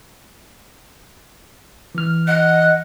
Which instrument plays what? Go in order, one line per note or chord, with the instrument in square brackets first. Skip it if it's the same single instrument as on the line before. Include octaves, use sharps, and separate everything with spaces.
[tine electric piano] E3 F6
[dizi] D#5 [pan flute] F#5 [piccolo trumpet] F#6